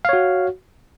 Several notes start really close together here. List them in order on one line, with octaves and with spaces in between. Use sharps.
F5 C#5 F#4